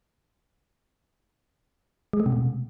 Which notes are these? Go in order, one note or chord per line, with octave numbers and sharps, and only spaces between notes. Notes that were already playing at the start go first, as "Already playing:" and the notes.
G#3
A3
C3
B2